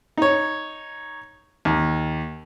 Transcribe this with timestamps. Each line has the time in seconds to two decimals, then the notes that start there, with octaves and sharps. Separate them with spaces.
0.17 D#4 C#5
1.65 D#2